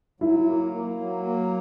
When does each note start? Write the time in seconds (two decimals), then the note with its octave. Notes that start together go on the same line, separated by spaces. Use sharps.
0.20 F#3 E4
0.48 A#3
0.73 A#3
1.00 F#3
1.26 A#3